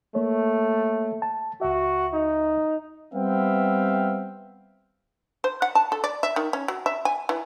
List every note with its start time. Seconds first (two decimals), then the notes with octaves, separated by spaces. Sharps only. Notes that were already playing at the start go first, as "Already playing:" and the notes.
0.15 A3 A#3 C#5
1.22 A5
1.61 C#2 F#4 E5
2.13 D#4
3.13 G3 B3 C4 E5 F5 G5
5.44 C5
5.62 F#5
5.75 A5
5.92 A4
6.04 D5
6.23 E5
6.36 D#3
6.53 C#4
6.68 F#3
6.86 E5
7.05 G#5
7.29 E3